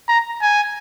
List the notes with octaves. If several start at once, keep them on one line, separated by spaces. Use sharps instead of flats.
A#5
G#5